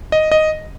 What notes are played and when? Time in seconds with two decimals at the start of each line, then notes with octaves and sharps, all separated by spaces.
0.12 D#5
0.32 D#5